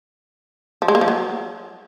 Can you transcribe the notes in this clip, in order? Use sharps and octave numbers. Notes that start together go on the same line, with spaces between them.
F3
G#3
A#3
F3
F#3